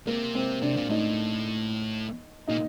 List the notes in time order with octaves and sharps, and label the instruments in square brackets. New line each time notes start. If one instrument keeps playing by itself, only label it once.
[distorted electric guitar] C3 [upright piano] A#3
[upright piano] C4
[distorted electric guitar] C3 [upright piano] D4
[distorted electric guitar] A#2
[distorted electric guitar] A2 [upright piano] D#4
[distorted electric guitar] A#2 [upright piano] D#4